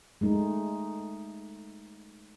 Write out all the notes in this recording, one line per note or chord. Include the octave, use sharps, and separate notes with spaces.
G#3 A3 D#4